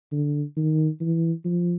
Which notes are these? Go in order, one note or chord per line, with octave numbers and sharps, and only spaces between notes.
D3
D#3
E3
F3